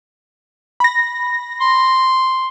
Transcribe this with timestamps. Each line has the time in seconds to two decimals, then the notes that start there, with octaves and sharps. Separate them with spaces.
0.80 B5 A#6
1.61 C6